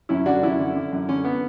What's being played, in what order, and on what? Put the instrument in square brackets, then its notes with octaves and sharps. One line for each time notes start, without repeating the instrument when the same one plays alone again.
[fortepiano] F#2 C#4 E4
D3 D4 F#4
F#2 C#4 E4
D3
D3
F#2
D3 C#4
B3